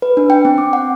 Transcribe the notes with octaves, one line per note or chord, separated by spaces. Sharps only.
B4
D4
G5
C4
D6
F#5